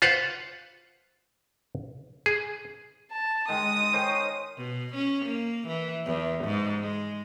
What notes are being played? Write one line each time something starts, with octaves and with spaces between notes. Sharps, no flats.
F4 B4 C5 F5 F#5
G#4
A5
D#3 G#3 D#6
D#3 C5 C#5
B2
C#4
A#3
E3
E2
G#2
G#3